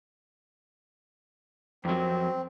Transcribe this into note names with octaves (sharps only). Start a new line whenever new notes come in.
F2 F#3 C4